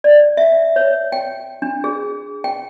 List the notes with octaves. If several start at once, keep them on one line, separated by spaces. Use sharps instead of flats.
D5
E5
C#5
G5
D4
G#4
G5